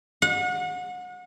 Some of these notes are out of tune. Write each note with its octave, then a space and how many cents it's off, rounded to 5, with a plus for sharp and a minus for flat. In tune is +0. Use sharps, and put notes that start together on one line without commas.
F#5 -35